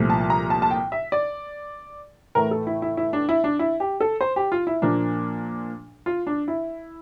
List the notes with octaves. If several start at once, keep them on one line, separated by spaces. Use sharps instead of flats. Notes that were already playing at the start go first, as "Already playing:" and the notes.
Already playing: C2 A#2 F3 A3
A5
A#5
A5
A5
G5
E5
D5
A2 E3 A3 A#4
A4
E4
E4
E4
D4
E4
D4
E4
G4
A4
C5
G4
F4
E4
A#2 F3 A#3 D4
F4
D4
E4